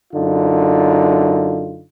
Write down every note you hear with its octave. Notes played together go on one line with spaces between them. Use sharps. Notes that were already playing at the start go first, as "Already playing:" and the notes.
F#2 D3 D#4 F4